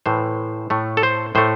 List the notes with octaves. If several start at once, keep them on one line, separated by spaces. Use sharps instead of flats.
A2 E3 A3 C5
A2 A3
A4
C5
A2 A3 C5